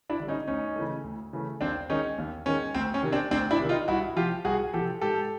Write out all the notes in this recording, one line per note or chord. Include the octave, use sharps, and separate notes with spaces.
D4 E4
D3 G3
C#4 D#4
D2 C#4 D#4
C#3 E3 A3
D2
C#3 E3 A3
D#2 C4 D4
D#3 G#3 C#4 D#4
D#2
D#3 G#3 C#4
D2 C4
C#4
C3 D#3
C4 D4
D2 C4 D4
D4 E4
C3 D#3
D#4 F4
C2 E4 F#4
C3 F3 F4 G4
C2 F#4 G#4
C3 F3 G4 A4
G#2 G4 A4